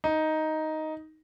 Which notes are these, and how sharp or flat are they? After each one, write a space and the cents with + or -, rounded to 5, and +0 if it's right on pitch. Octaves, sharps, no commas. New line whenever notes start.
D#4 +5